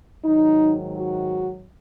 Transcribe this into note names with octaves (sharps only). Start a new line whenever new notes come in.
G#2 D#3 F#3 D#4
F#4